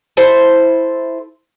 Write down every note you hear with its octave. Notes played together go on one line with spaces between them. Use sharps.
E4 A4 C5